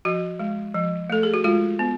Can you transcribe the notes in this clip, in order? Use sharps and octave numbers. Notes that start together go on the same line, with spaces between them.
F3 F#4
G#3
F3
A3 A4
G#4
F#4
G#3 F4
B3